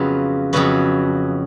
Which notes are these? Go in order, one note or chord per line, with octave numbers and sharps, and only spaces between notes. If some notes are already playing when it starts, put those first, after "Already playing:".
Already playing: F2 C#3 F#3 B3 F4
F2 C#3 F#3 B3 F#4